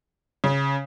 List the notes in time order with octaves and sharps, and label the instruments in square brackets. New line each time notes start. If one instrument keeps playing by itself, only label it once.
[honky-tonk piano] C#3